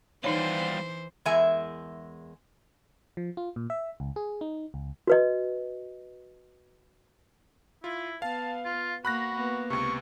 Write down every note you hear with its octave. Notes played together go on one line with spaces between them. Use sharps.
E3 G3 D#4 F4 C5 C#5
E2 G#3 A#4 E5 G#5
F3
F4
A#2
E5
C#2
G#4
D#4
C#2
F#4 B4 D#5
E4 F4
B3 F5 A5
F4
A#3 F#4 B5 F#6 A#6
A#3 B3
C#2 C3 C#6